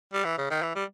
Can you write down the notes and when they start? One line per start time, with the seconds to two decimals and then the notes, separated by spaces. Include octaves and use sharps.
0.13 G3
0.25 E3
0.38 C#3
0.51 D#3
0.62 E3
0.75 G3